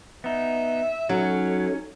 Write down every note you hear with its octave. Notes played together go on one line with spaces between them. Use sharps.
B3 D#4 E5
F#3 C#4 D#4 A4